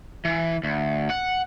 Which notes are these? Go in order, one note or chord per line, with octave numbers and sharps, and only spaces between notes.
E3
D2
F#5